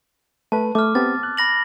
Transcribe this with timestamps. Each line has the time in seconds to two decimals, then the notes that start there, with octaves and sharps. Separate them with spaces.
0.52 A3 B4 A5
0.75 A3 D6 F6
0.95 B3 C4 G4 A6
1.23 F#6
1.37 B5 A#6 F#7